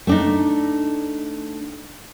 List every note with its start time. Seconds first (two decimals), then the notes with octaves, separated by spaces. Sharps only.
0.07 A3 D4 D#4